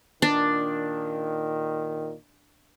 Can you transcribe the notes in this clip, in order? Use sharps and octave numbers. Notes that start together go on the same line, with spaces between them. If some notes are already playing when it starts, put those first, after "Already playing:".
A#2 D#3 D4